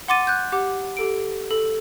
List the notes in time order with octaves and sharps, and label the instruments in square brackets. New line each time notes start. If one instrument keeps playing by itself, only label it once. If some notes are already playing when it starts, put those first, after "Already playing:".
[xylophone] F#5 C6 D6 A6 D#7
F#6 G6
G4 F#5 D6
G4 A4 D7
A4